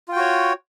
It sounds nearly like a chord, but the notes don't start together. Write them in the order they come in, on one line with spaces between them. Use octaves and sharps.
F4 G5 F#4 C#5